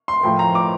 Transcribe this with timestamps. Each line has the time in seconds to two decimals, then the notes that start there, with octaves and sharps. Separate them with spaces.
0.08 C6
0.23 A2 F3 G5
0.39 A#5
0.55 D6